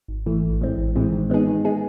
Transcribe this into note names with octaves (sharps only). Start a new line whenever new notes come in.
G#1
G#2 E3 A3
A1
A2 E3 G#3 C4
A1
A2 E3 G#3 C4
D#3
G#3 B3 D#4 G#4
D#3
G#3 B3 D#4 G#4